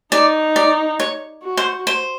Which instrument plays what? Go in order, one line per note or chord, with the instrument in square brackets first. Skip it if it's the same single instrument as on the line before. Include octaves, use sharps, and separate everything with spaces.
[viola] D#4 [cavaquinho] D5
[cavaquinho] D5
C#5
[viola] F#4
[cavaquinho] C5
C5